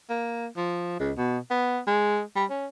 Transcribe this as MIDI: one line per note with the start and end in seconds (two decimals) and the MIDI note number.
0.10 0.47 58
0.57 0.95 53
0.99 1.12 37
1.17 1.38 47
1.51 1.79 59
1.87 2.21 56
2.36 2.45 55
2.50 2.66 61